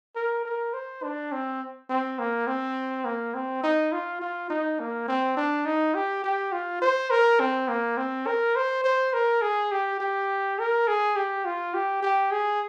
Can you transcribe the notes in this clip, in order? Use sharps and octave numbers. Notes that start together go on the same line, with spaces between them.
A#4
A#4
C5
D4
C4
C4
A#3
C4
A#3
C4
D#4
F4
F4
D#4
A#3
C4
D4
D#4
G4
G4
F4
C5
A#4
C4
A#3
C4
A#4
C5
C5
A#4
G#4
G4
G4
A#4
G#4
G4
F4
G4
G4
G#4